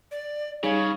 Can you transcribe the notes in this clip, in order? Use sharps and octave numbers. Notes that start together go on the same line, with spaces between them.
D5
C#3 G3 C#4 D#4 G#4 C#5 F5 G#6